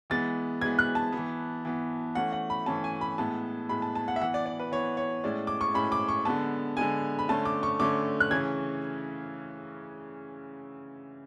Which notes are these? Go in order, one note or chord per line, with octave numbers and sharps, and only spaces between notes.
E3 G#3 B3 A6
E3 G#3 B3 G#6
F#6
A5
E3 B3
E3 B3
E3 A3 C#4 F#5
F#5
B5
E3 A3 C#4 A5
G#5
B5
A2 G#3 B3 A5
A2 G#3 B3 B5
A5
A5
F#5
E5
E3 B3 F#5
D5
D5
B4
E3 B3 C#5
C#5
A2 G#3 C#4 D5
D6
C#6
A2 G#3 C#4 B5
D6
C#6
D3 G#3 B3 A5
D3 G#3 B3 G#5
B5
D3 A3 C#4 A5
D6
C#6
D3 A3 C#4 D6
F#6
C#3 E3 A3 C#4 G#6